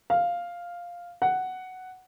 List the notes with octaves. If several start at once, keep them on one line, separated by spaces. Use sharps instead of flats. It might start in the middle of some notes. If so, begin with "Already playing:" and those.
F5
F#5